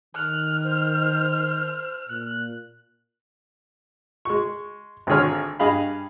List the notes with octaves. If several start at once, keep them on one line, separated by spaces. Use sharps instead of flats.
D#3 F6 F#6
C5
A#2 F#6
G#3 C#6
G#1 G#2 D3 G#4 C#5 F6
G2 G#4 D#5 F5 B5